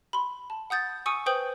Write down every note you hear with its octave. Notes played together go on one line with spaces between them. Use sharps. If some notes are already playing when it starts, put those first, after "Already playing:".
B5 C6
A5
F#5 D#6 G6 A6
G#5 C#6 D#6 E6 C#7 D#7
B4 C5 G5 D#6 G6 F#7